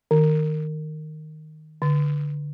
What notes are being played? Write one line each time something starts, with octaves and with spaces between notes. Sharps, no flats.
D#3
D3